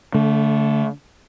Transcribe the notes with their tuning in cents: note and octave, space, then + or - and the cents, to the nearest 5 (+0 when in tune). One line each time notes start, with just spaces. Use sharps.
D3 -35 A3 +0